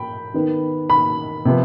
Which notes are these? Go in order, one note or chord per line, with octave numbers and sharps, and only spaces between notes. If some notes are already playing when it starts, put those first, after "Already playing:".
Already playing: G5 B5
D#3 B3
B5
C3 F3 B3